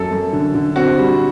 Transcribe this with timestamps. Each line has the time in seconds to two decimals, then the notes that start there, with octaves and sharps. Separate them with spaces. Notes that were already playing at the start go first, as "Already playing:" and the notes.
Already playing: F#2 A4
0.12 F#2
0.33 D3
0.54 D3
0.76 C4 F#4
0.98 G3